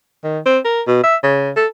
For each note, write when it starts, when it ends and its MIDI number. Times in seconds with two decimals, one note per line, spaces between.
0.24 0.40 51
0.46 0.59 60
0.65 0.82 70
0.87 1.01 47
1.04 1.16 76
1.23 1.51 49
1.57 1.67 69